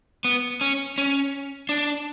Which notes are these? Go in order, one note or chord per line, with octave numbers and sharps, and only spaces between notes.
B3
C#4
C#4
D4